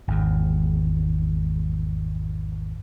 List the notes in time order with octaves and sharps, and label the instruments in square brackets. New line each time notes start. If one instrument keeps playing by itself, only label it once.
[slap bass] G#1 E2 G#2